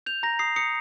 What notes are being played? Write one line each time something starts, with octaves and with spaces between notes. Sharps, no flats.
G6 F7
A#5 A#6
D#6 C7
D#6 C#7